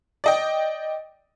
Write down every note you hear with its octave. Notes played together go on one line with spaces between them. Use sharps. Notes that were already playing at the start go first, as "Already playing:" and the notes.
D5 D#5 G5